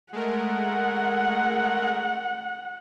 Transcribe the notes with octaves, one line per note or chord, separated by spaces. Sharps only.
G#3 A3 A#4 F#5